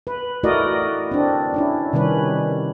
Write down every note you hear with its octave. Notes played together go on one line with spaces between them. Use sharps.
B4
A3 E4 F#4 A#4 D5 D#5
C4 D4
C#4 D4 E4
C3 D#3 G3 C#4 B4